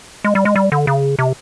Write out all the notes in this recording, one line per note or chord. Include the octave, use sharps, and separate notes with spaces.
G#3
G3
G#3
G3
D3
C#3
C3